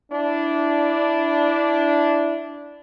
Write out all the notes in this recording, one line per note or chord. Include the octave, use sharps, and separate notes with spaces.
D4 E4